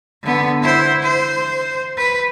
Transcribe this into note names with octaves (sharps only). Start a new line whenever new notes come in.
D3 B3
E4 C5
C5
B4